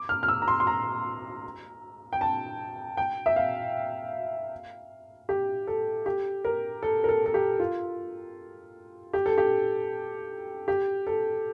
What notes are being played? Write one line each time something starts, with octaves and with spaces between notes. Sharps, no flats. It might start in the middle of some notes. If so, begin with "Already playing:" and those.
Already playing: D6
F6
F6
E6
A#5
C6
C6
A#5
G5
A5
G5
E5
F5
G4
A4
G4
A#4
A4
A#4
A4
A4
G4
F4
G4
A4
G4
G4
A4